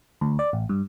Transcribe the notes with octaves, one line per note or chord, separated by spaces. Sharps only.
D2
D5
A1
G2